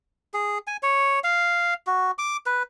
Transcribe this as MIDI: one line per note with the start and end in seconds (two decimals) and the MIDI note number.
0.34 0.58 68
0.67 0.77 80
0.83 1.19 73
1.24 1.74 77
1.87 2.11 66
2.18 2.37 86
2.46 2.63 71